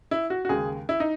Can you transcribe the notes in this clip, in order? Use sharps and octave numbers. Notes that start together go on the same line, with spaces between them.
E4
F#4
F#4
D#2 C#3 G#3 G#4
E4
D#4